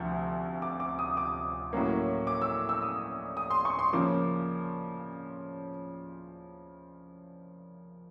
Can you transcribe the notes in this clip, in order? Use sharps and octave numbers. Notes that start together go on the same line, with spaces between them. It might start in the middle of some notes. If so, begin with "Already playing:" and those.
Already playing: D2 C3 F3
D6
D6
D#6
D6
A2 F#3 A#3 C#4
D6
E6
E6
D#6
D#6
C6
C#6
C6
C#3 F3 A#3 C#4 D6